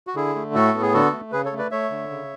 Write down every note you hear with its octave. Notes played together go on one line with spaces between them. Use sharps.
F#4
D3 E4 G#4
A3
A2 F#4 A4
B3
G#4
D3 F#4 A4
A3
C#3 G#4 B4
A4 C#5
A3
B4 D5
A3 C#5 E5
D3
C#3